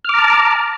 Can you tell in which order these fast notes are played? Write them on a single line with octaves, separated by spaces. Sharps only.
F6 D6 A#5 A5